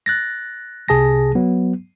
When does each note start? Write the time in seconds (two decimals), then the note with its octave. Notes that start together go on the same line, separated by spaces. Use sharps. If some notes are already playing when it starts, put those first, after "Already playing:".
0.06 F#6 A6 A#6
0.88 C2 C3 G#4 A5 A#6
1.35 F#3 B3